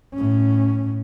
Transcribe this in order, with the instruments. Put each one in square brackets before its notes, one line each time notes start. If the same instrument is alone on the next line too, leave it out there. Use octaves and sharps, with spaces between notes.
[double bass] A2 C#4